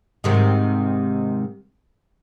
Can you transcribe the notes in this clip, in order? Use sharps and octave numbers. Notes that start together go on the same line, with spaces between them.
G#2 C3 D#3